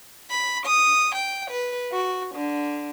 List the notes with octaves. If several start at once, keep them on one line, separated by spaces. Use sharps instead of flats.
B5
D#6
G5
B4
F#4
D3